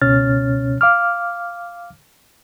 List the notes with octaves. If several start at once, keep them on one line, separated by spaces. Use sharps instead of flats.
C#2 B2 C#4 C#5 F6 A6
F5 D6 F6